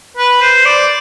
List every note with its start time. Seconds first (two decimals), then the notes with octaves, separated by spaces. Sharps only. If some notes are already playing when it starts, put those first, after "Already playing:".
0.17 B4
0.41 C5
0.65 D5